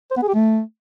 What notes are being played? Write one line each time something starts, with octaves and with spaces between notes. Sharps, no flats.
C5
B3
G#4
G4
A3